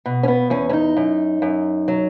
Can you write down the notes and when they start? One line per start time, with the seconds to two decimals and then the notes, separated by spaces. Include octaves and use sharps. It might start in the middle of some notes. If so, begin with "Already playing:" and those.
0.06 B2
0.23 C#4
0.28 B3
0.50 E2 C#4
0.69 C#4
0.73 D#4
0.97 F#2
1.42 F#2
1.88 F#3